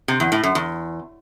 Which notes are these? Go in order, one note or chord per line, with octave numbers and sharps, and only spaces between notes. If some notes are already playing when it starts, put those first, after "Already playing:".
C3
E2
A2
F#2
E2